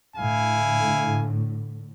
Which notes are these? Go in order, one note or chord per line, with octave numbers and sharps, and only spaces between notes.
A2 D3 E4 F5 G#5